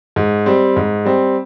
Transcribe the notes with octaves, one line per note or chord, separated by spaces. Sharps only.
G#2
G3 C4
G#2
G3 C4